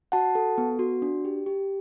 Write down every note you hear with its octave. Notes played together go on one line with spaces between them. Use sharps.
F#4 F#5 A5
A4
B3
F#4
D4
G4
G4